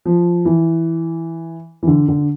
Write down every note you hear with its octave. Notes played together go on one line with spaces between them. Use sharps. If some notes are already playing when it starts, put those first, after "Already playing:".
F3
E3
E3
D3
D3